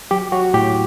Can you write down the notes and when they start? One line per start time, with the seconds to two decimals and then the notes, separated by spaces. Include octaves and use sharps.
0.11 F#3 G4
0.32 F#3 F#4
0.54 A2 G4